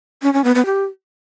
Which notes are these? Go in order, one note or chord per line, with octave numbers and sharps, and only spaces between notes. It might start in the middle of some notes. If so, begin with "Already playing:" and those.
C#4
C#4
B3
B3
G4